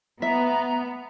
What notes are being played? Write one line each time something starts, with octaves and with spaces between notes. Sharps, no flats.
B3 E5 A#5